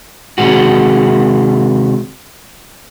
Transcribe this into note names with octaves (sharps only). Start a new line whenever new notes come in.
C3 D#3 G#3 F#4